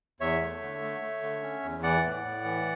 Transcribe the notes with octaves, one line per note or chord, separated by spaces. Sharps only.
E2 C#5 E5
A3
D3
A3
A3
D3
C#4
E2
E3 D5 F#5
A2
A2
E3